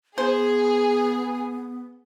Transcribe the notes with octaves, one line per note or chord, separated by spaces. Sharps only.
B3 G#4 C5